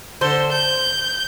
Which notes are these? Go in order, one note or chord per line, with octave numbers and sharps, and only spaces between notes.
D3 A4 C5
G6